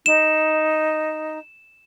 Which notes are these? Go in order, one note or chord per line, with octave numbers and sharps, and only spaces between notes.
D#4 E7